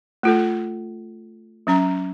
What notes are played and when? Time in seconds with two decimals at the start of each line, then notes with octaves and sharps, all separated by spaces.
0.23 A3 F4 A4
1.67 F#3 C#4 A#5